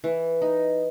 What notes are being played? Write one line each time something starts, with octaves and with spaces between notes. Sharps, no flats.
E3
D#4